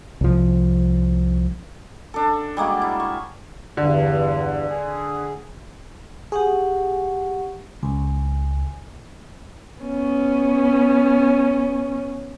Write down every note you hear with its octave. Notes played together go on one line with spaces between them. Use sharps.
C2 F3
D4 A4
G3 G#3 A#3 F#4
E4
C#6
E2 G2 D3
G#4
G4 G#4 F#5 C#6
C#2 G#5
B3 C#4